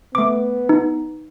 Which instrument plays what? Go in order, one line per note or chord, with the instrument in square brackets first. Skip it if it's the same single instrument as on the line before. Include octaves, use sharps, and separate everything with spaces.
[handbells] A3 D6 [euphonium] B3
[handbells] D#4